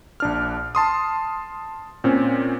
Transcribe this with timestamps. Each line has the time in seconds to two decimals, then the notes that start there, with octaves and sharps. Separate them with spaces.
0.20 A#1 D4 F6
0.75 A5 C6 D#6
2.04 A#2 C4 C#4